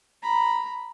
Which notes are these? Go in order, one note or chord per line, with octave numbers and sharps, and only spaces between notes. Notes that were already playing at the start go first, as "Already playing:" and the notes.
A#5 B5